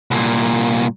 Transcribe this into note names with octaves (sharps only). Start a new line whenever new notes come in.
C2 A#2